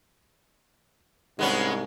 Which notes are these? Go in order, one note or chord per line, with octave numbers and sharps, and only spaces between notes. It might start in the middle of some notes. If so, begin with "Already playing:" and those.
C2 G#2 G#3 B3 C#4